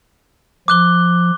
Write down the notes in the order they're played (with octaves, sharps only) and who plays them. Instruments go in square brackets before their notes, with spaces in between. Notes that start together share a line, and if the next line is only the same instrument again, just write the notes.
[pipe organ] F3 [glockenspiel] D6 F#6 G7